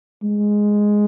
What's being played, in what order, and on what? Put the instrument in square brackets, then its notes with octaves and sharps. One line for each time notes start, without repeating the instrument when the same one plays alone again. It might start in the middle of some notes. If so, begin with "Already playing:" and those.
[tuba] G#3